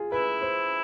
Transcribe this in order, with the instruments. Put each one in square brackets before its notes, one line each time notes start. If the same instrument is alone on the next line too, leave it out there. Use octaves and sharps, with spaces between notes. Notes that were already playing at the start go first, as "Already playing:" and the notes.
Already playing: [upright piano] F4 G#4
[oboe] E4 [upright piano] B4
[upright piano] C5